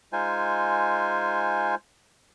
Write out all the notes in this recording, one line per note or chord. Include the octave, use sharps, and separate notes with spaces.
G#3 D#4 F4 C5 G#5